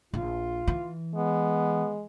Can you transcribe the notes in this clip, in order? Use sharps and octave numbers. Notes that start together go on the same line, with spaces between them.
A#1 F4
E3
G#3 B3